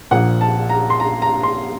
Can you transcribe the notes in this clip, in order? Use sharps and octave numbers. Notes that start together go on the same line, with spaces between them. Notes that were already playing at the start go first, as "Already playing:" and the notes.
A#1 A#2 F3 A#3 F#5
A5
A#5
C6
A#5
A#5
C6